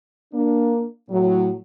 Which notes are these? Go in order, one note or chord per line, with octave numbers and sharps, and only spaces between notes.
A#3 D4
A2 F#3